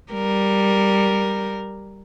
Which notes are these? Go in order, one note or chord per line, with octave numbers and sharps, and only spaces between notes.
G3 A#4